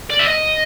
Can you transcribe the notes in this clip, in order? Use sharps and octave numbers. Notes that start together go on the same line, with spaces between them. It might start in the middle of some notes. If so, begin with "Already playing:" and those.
D5
E5
D#5